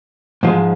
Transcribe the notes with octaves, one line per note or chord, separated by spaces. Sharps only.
G#2 F3 G#3